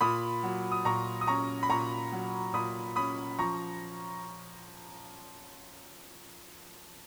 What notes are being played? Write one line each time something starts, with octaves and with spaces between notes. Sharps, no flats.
A#2 B5 D#6
F#3
D#6
A#2 A#5 C#6
D#6
C#4 A#5 C#6
B5
A#2 A#5 C#6
F#3
A#2 B5 D#6
C#4 B5 D#6
F3 A#5 C#6